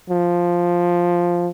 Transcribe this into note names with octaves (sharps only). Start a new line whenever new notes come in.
F3